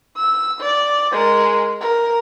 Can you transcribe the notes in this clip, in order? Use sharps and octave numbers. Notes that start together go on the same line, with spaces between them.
E6
D5
G#3 A#4
A#4